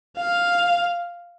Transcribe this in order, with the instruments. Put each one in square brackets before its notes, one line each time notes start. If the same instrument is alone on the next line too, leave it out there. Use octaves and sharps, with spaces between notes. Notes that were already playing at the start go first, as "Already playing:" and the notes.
[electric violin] F5